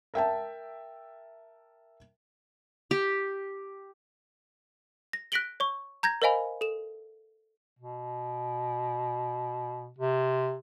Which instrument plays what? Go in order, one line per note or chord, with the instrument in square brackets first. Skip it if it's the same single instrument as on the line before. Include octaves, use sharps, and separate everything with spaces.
[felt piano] A#4 E5 G5 A5
[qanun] G4
[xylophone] A#6
F#6 A#6 B6 D7 F#7 G7
C#5 C#6
A#5 G6 G#6 A#6
A#4 C5 D#5 F5 G#5 B5
A4 E7
[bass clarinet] B2
C3